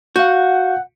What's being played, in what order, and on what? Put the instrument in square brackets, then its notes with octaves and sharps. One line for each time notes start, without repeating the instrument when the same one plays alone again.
[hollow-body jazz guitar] F#4 [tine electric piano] F5 G6 [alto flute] F#5